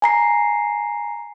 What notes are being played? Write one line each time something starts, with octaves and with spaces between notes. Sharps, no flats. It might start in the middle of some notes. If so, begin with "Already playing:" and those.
G#5 A#5 C7